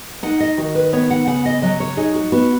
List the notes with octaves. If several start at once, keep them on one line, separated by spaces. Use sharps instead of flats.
D#4 F#5
D#5
D#3 F#4
B4
B3 C#5
F#5
C#3 F#5
D#5
F#3 D#5
C#5
D#4 G#4
F#4
B3 F#4